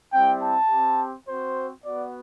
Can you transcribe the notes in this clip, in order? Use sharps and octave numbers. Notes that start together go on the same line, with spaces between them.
G3 C4 E4 G5
A5
C4 G4
C4 F#4 C5
B3 F#4 D5